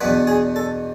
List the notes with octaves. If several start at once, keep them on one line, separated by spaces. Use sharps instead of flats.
E2 B2 B3 D4 B4
G#4
A4